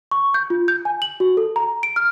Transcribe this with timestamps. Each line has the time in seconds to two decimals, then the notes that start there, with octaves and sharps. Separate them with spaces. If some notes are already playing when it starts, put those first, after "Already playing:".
0.11 C#6
0.34 G6
0.50 F4
0.68 G6
0.85 G#5
1.02 F#7
1.20 F#4
1.37 A4
1.56 A#5
1.83 D7
1.96 F6